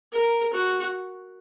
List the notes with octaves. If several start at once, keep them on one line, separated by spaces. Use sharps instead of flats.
A#4
F#4